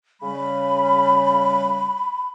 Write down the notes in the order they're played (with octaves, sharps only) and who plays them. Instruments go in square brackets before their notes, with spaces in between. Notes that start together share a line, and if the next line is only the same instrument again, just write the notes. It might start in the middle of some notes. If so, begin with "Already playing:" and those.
[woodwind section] C#3 G3 [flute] B5